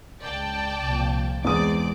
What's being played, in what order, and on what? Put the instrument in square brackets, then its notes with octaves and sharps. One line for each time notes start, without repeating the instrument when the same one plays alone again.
[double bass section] C#2 [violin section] D5 G5 A5
[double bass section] C2 A#2 F3
[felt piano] E2 D#6 [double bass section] G#3 [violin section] C4 D5 D6